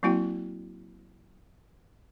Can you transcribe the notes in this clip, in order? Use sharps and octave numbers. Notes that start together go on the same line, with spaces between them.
F#3 A#3 C4 E4 F#4 G5